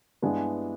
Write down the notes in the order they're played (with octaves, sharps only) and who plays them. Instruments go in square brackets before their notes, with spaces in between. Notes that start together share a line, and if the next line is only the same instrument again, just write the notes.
[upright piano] G2 E3 G#3 B3 D4